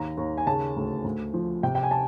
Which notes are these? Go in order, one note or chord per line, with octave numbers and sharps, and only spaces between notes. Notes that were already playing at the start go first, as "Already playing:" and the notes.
Already playing: D#2 A#5
D#2
G#5
C#3 A5
D2
D2
F3
C3 G5
G5
G#5
A5